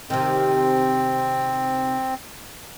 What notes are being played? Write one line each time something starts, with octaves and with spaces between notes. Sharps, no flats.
C3 D#3 C4